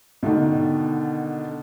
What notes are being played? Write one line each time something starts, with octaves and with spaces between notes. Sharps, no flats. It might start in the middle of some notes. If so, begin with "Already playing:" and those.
B2 D3 D#3